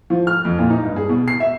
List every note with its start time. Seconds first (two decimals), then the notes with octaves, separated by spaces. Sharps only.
0.10 F3
0.27 F6
0.45 F2
0.59 A#2
0.70 D#4
0.83 G2
0.96 G#4
1.09 B2
1.28 C7
1.40 E5